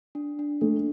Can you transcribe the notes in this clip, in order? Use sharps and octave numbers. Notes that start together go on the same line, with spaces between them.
D4
D4
A3 D4